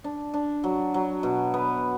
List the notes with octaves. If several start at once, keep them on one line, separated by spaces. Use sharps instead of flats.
D4
D4
F#3
F#3
B2
B3